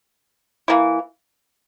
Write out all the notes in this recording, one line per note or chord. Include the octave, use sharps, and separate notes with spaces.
E3 A#3 E4